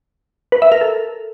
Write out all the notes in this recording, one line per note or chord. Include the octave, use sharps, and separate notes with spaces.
B4
E5
A#4
A4